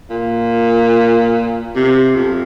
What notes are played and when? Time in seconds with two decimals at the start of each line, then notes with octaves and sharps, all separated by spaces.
0.11 A#2
1.76 C3
2.16 F2